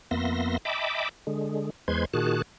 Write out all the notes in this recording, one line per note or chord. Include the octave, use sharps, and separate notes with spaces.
F2 A#3 B3 E5 C6 A#6
D#5 E5 G5 A5 B5 D6
D3 G#3
E2 G#3 B4 C5 C6 G#6
A#2 D#3 F#4 G#4 A5 F#6